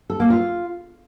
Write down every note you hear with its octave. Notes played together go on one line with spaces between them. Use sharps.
A4
A#3
F4